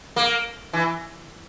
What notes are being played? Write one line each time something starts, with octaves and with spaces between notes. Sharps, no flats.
A#3
E3